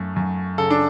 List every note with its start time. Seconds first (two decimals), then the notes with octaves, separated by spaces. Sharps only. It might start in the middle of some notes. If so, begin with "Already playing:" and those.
Already playing: F#2 A3
0.16 F#2
0.58 C#3 A4
0.70 D4